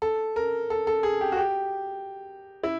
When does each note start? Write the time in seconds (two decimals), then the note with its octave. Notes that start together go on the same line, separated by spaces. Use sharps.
0.02 A4
0.36 A#4
0.70 A4
0.87 A4
1.03 G#4
1.21 G4
1.32 F#4
1.37 G4
2.63 E4